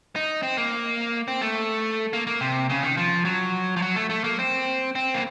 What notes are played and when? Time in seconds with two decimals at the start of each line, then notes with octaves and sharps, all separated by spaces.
0.16 D#4
0.43 C4
0.57 A#3
1.28 C4
1.42 A3
2.13 A#3
2.27 A#3
2.40 C3
2.69 C#3
2.83 D#3
2.97 F3
3.25 F#3
3.77 F3
3.82 F#3
3.96 A3
4.10 A3
4.24 A#3
4.39 C4
4.95 C4
5.14 A#3